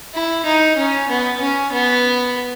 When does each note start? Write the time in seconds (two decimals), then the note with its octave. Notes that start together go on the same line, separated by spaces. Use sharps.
0.14 E4
0.45 D#4
0.77 C#4
1.09 B3
1.40 C#4
1.72 B3